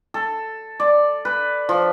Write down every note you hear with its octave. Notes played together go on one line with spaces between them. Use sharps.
A4
D5
B4
F3